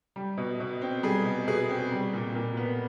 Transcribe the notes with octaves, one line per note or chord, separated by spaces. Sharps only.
G3
B2
B2
C4
G3 G#4
B2
B2 G#4
C4
G3
A#2
A#2 A#4
B3